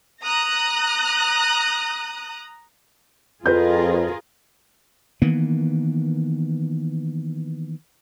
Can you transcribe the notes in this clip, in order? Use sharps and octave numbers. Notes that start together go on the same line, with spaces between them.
A#5 D#6 F#6
F2 F4 G#4 A#4 B4 G6
D#3 E3 A#3 B3